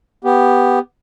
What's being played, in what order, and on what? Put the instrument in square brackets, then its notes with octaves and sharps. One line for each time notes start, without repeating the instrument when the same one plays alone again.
[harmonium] B3 G4